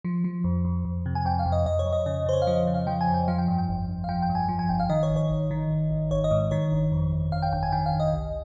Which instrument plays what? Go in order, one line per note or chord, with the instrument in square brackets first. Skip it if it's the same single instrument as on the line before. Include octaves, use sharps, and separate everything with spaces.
[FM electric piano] F3
F3
F2
F2
F2
C3
G#5
F2 G5
F5
F2
D#5
F2 D#5
C#5
F2
D#5
C#3 D#5
C#3 C5
C#5
F5
F3 D#5
C#3
F5
F3 G5
G#5
F2
G5
F3 F5
G5
G2
G5
G1
G1
F5
F3 G5
G5
G2
G#5
F3
G#5
G1 G5
F5
D#3 D#5
C#5
G#1
C#5
G#1
D#3
G#1
G#1
G#1 C#5
D#5
G#2
D#3 C#5
G1
F2
G1
G1 F5
G5
G1 G5
G#5
D#3 G5
F5
G1
D#5
C2